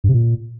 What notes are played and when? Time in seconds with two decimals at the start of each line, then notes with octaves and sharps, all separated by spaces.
0.04 G2
0.09 C3
0.14 A#2